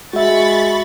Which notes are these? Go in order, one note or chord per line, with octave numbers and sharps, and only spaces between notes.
G#3 F#4 E5 B5 C#6 A6